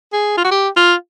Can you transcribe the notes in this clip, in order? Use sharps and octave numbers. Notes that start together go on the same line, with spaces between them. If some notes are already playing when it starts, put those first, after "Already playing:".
G#4
F4
F#4
G4
F4